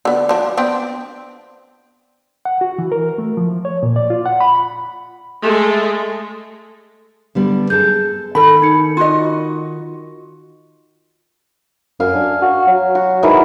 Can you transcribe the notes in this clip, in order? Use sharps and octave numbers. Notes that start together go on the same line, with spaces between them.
D3 B3
F3 D4
B3 C4 D4
F#5
F#4
E3
A#4
A3
F3
C#5
A#2
D5
F4
F#5
B5
G#3 A3
D3 G3 B3
G#4 A4 G6
D#3 A4 B5
D#4 C#7
F4 F#4 D#5
F#2 F5 G#5
D4
F#4
F#3
F#4
G#2 D#3 E3 F#3